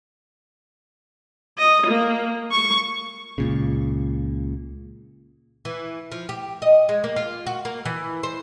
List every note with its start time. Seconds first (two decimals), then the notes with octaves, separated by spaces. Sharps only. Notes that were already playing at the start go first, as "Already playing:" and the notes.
1.58 D#5
1.87 A#3
2.52 C#6
3.38 C#2 A#2 C#3
5.65 E3
6.12 F3
6.29 G4
6.62 D#5
6.89 G#3
7.04 A#3
7.16 F4
7.47 F#4
7.65 A#3
7.85 E3
8.23 C5